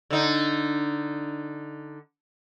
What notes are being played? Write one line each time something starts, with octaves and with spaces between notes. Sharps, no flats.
D3 D#4